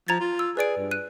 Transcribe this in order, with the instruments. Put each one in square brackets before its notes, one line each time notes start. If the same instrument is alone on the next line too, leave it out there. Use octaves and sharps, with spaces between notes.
[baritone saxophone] F3 [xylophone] A#5 G#6 A6
[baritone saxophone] F4
[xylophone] E6
[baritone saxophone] G#4 [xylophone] B4 D5 D7
[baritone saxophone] G2
[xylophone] F#6 D#7